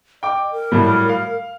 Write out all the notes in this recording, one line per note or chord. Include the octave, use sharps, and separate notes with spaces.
D#5 G5 D6
A#4
A2 F#3 G3
F5